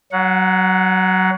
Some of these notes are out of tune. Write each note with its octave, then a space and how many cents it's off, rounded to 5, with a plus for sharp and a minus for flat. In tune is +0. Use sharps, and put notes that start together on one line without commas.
F#3 +20 F#5 -25